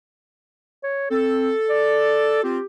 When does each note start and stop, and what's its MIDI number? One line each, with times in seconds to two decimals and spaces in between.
0.84 1.10 73
1.11 1.51 60
1.11 2.40 69
1.70 2.39 74
2.43 2.58 60
2.43 2.58 65
2.43 2.66 67